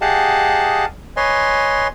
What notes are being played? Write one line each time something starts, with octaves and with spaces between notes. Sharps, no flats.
G4 G#4 D#5 F5 F#5 A5
B4 C#5 D#5 G#5 C6